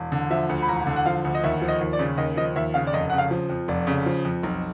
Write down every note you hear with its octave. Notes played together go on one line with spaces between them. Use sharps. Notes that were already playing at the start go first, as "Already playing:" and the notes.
Already playing: E1
D3
F3 E5
D2
B5
E1 A#5
D3
F#5
F3 F5
D2
D#5
D#2 E5
F3
D#5
D#2
D5
C#3
D#2 D#5
F3 D#5
D#2 E5
C#3 F5
D5
F1 D#5
C#3 F#5
F5
F3
F2
F1 D5
C#3
F3
F2
B1